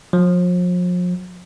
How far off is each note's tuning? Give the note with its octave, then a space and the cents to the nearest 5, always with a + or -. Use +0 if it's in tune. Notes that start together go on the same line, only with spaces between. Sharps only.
F3 +40